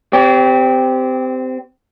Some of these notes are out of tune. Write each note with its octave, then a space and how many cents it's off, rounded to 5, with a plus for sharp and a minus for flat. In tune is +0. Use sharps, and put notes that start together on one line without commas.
C4 -25 G4 +0 C#5 +45